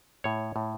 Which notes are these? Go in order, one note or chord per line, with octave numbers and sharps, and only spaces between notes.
A2 C#5
A2